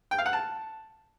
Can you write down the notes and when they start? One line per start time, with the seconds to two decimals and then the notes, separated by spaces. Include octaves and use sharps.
0.11 G5
0.18 F5
0.26 F#5
0.33 A5